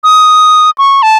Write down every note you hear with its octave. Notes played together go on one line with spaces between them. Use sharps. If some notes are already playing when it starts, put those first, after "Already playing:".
D#6
C#6
A5